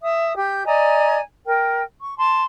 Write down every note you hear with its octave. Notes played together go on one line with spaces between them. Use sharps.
E5 D#6
G4 G6
D5 D#5 G#5 A#5
A#4 G5
C#6
A5 C6